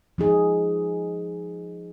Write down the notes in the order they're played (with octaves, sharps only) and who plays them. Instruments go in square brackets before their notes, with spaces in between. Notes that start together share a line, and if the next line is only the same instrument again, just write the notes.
[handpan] F3 D#4 G#4